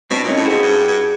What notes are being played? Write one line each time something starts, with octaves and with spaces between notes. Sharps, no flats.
B2 C4 D4
A#2 C#4 D#4
A2
G#2 F#4 G#4
G2
G2